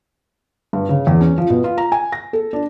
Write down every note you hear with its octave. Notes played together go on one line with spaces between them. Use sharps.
G2
C#3
E2
C#4
F3
B2
F4
A#5
G#5
A#6
A4
D4